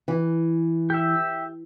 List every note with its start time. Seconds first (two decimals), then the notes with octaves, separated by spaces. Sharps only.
0.08 E3
0.90 G4 E5